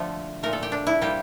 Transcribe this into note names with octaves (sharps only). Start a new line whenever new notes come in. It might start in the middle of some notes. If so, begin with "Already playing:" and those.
Already playing: D3 F3 A3
A#2 A3 A#4
A4
G4
D4
E4
C3 G3 A#3 G4